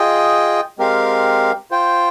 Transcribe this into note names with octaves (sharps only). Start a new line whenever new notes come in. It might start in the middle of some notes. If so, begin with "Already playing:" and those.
Already playing: F4 G#4 D#5 G5
G#3 C4 G4 A#4 F5
F4 C5 G5